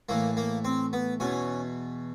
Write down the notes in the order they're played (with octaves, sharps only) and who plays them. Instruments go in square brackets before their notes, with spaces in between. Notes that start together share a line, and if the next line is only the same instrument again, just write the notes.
[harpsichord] A2 E3 A#3
A#3
C4
B3
E2 B2 C#4